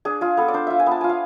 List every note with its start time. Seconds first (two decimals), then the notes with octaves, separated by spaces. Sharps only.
0.05 D4 G#4
0.21 F4 G#4
0.37 B3 A4
0.48 D5
0.54 D4 C5
0.67 F4 E5
0.79 G#5
0.86 B3 A5
1.01 F4 G#5
1.09 F5